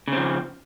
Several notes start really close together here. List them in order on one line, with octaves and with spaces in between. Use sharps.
C#3 C4 F3